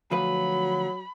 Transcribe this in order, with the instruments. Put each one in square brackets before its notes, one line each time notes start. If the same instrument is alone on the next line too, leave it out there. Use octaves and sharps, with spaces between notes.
[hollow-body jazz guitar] D2 F3 B4 [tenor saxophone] F#3 [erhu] B5